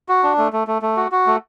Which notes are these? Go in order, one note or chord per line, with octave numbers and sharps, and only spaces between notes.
F#4
D4
A3
A3
A3
A3
F#4
F#4
A3